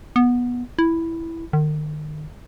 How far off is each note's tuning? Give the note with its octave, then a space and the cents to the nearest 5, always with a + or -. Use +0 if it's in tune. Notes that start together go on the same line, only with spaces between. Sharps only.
B3 -15
E4 +0
D#3 -40